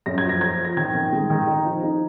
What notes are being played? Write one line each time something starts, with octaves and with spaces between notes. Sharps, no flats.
F#2 A#6
G#6
F3
A#6
F3 G#6
F3
A#6
D#3 G#6
D#3
G#3
D#3
D#4
F3
D#4